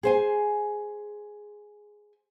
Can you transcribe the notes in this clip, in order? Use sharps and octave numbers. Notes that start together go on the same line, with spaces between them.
G#4 C5 G#5